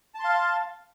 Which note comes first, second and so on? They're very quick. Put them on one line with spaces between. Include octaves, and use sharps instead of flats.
A5 C6 F5